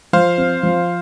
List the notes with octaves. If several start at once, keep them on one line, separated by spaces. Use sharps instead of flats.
F3 C5 F5
C4
F3